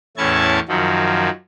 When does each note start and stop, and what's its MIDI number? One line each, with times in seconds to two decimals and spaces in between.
0.17 0.59 40
0.17 0.59 45
0.17 0.59 61
0.17 0.59 64
0.17 0.59 81
0.17 0.59 92
0.68 1.29 42
0.68 1.29 51
0.68 1.29 53
0.68 1.29 54